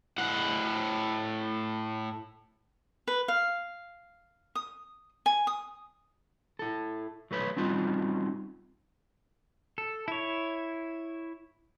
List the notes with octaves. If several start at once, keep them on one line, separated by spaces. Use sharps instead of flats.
A2 F#5
B4
F5
D#6
G#5
D#6
E4 A4
F#3 A3 B4 C#5
G3 C4 C#4 D#4 F4 F#4
A4
E4 C#5